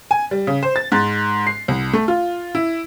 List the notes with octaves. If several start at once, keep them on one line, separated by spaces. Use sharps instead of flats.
G#5
G3
C#3
C5
A6
G#2
C7
C2
A3
F4
E4